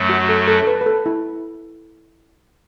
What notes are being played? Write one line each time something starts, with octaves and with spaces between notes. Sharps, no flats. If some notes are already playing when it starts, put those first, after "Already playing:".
Already playing: F#2 F#3 A3
F#4
A4
A4
A4
B4
B4
A4
E4